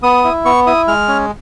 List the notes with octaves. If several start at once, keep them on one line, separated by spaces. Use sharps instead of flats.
B3 D#6
E4
B3 C#6
E4 D#6
G#3 F6
C#4